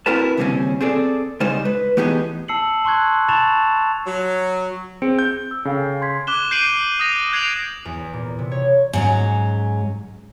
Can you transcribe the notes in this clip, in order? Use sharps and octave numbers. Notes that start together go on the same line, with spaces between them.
C4 E4 F#4 A#4 B4 A5
D#2 C#3 G3 A3 C4 C#4
C4 G#4 A4 D5
C#3 G3 G#3 D#4 C5
B4
E3 A3 B3 D#4 G4 G#4
A5 E6 C7 C#7 F#7
A5 C6 C#6 F#6 G#6
A5 B5 C#6 A6 E7 F7
F#3
C4 G#4 C#7 D7
G6
E6
C#3 A4 F5 G5
C6 G#6 B6
D6 F#6 E7 G7
G6 C7 D7 D#7 F#7
D#6 A#6 F7
F#6 G#6 C7 D7 F7 F#7
E2
A#2
C3
C#5
G#2 F#3 C#4